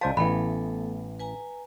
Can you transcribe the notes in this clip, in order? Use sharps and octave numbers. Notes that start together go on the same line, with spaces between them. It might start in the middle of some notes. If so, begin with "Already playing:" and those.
C#2 C5 D5 D#5 F5 G#5 A5
A1 E3 A3 B3 A4 B5
B4 G#5 A#5